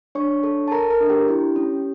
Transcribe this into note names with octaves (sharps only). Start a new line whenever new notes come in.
D4 C#5 C#6
A4
A5
A4 A#4 A#5
A#4 A#5
D4
G4 G5
E4
C#4